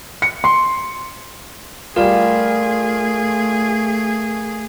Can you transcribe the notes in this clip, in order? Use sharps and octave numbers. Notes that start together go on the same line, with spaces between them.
C#7
C6
G3 A3 F4 G#4 A#4 F5